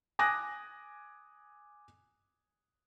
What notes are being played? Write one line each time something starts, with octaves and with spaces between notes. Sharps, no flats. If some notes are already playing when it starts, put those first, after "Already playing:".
G#5 D6 D#6 F#6 A#6